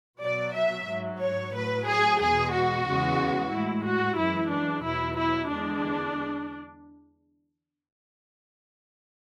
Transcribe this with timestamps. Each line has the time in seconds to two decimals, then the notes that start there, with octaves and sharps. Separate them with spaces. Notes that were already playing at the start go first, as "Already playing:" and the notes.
0.21 B2 F#3 D5
0.55 E5
0.88 G#2 F#3
1.20 C#5
1.53 A2 F#3 B4
1.87 G#4
2.19 E2 B2 G#3 G#4
2.53 F#4
2.87 E2 C#3 E3 G#3
3.52 A2 G#3 E4
3.86 F#4
4.19 F#2 E3 G#3 E4
4.52 D4
4.85 E2 B2 F#3 E4
5.19 E4
5.51 E2 D3 G#3 D4